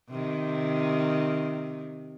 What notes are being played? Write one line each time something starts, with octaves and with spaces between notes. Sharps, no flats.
C3 D#3